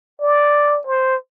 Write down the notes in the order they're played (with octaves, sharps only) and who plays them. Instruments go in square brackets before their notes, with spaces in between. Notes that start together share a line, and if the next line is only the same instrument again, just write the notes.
[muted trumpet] D5
C5